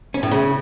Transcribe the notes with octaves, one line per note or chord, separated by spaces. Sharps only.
C#4
A2
C#3